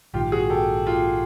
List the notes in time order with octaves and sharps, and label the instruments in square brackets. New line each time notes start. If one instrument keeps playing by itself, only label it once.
[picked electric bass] A#1 G#2 D#3 [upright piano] F4 G4
[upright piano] F#4 G#4
G4 A4
F4 G4